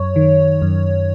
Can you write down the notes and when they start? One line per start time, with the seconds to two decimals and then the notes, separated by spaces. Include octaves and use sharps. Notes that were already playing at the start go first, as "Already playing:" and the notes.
Already playing: F#2 C#5
0.16 D#3
0.62 F#2